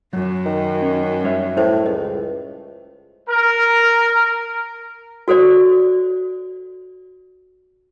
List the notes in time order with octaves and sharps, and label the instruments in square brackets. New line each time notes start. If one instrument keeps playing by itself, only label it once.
[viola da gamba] F#2 [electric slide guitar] F#3
[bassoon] D#3
[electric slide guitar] C#4
G3 C#5 E5
[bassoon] A2 [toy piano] C#4 E4 C5
[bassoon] C#2 [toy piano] D#5
[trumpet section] A#4
[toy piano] F#4 A4 C5 D5